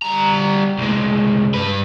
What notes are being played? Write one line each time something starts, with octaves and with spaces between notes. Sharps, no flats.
G3 A#5
C2 G#3
G2 B4